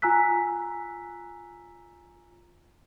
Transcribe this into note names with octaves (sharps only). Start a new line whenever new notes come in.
F4 G#5 A#5 E6 F#6 B6